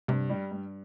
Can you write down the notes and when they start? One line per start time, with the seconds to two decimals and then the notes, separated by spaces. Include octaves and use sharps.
0.08 G2 C3
0.30 G3
0.52 G2